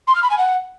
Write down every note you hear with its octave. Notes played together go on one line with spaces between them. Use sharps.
C6
F6
B5
G#5
F#5